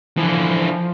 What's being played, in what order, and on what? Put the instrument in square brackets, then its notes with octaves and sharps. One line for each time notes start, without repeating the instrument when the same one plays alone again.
[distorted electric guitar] D3 E3 [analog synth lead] F3